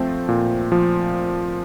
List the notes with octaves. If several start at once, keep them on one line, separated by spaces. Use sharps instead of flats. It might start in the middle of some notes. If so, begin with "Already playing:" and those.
Already playing: F3 A3 C4
A#2
F3